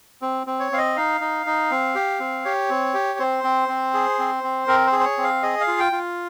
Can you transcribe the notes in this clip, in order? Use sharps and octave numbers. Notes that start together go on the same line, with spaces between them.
C4
C4
C#5
C4 F5
D#5
D#4 F5
D#4
D#4
C4
G4
C4
G4 C#5
C4
G4
C4 C5
C4
C4
G#4
C4
C4
C4 A#4
C5
G#4
C5
C#5
C4
F5
G#4 D#5
F5
F4
G5
F4